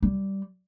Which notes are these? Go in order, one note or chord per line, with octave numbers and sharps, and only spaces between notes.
G3